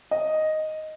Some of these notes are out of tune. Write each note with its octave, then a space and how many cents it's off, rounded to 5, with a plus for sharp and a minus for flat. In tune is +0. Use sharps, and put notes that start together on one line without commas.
D#5 +0